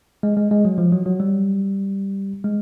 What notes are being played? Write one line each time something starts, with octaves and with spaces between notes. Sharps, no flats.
G#3
G#3
G#3
F#3
F3
F#3
F#3
G3
G#3